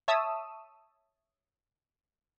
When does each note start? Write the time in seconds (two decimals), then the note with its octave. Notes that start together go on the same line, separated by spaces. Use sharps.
0.08 C#5 E5 A5 D#6 E6